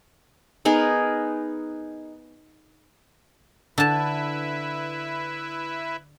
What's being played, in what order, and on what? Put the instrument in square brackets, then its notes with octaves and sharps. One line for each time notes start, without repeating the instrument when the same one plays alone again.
[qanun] B3 D#4 G#4 A#4
[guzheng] D3 A5 [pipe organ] E4 B4 E5